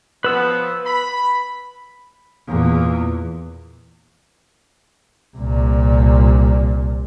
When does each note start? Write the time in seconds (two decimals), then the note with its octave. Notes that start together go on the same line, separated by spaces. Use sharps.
0.24 F3 B3 B4 E6
0.86 B5
2.47 E2 A#2
5.37 C2 A#2